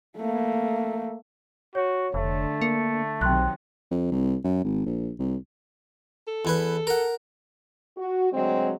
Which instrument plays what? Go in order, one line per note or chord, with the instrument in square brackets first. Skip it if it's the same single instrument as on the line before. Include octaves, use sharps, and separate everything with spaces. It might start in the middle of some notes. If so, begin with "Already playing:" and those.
[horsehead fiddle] A3 A#3
[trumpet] F#4 [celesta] C#5
[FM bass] F1 [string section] D3 [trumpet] A3
[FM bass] A#3 [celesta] C#7
[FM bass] B1 [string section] C3 D#3 F#3 [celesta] G5 C6 F#6
[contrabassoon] F2
C2
F#2
G#1
A#1
C2
[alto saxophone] A4
[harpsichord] E2 E4 B4
A#4 F#5
[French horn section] F#4
D2 F#3 G#3 C4